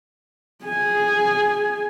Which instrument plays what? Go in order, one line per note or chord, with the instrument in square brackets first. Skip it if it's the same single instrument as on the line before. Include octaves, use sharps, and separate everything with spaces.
[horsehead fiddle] G#4 G#5